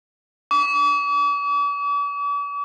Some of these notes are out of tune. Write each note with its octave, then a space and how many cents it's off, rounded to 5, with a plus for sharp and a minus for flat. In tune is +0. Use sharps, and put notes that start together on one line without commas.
D6 -45